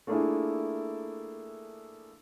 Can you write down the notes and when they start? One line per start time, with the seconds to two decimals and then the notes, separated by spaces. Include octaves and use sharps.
0.07 A3 A#3 D4 E4 F4 G#4